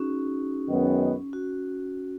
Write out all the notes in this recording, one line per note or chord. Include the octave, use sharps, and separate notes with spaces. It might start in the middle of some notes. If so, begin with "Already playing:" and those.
Already playing: C#4 D#4 F#4 G#4
F#2 D#3 G#3 B3
F#4